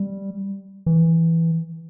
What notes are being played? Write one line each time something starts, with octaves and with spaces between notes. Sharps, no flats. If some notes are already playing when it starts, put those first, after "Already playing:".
Already playing: G3
E3